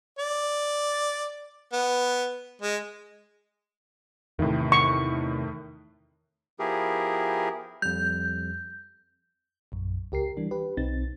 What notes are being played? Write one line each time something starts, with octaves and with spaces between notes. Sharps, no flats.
D5
B3
G#3
E2 A2 C3 D#3
C#6
F3 B3 E4 G4 G#4 A#4
F2 G3 G6
A#1 F#2
C#2 G4 A#4 C7
E3 G3 D4
G4 B4
B1 C4 D#4 A6